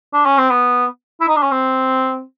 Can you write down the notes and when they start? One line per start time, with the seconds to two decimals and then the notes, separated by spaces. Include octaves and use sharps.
0.14 D4
0.26 C#4
0.38 C4
0.50 B3
1.21 E4
1.28 D#4
1.36 D4
1.43 C#4
1.51 C4